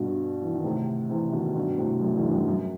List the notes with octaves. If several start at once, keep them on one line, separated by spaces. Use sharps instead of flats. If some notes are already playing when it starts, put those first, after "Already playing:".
Already playing: G2 B2
E3
D#3
A2 C3
C3 E3
B2 D#3
G2 B2
A2 C3
F#2 A2
E2 G2
G2
F#2
F#2